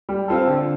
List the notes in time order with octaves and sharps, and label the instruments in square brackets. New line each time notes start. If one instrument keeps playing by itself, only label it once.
[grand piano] G3
C4 F4 A4
D3